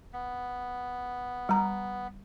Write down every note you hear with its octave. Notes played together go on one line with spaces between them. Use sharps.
B3
G3 A#5